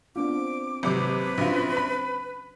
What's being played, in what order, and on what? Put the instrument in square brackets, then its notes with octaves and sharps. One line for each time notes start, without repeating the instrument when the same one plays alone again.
[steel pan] B3 D4 F4 [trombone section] C4 [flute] D6
[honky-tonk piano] G#1 C3 D6 [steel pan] F3 F#3 A#3 [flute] B4
[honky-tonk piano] A#1 F4 [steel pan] C#3 D4 F#4
[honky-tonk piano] B5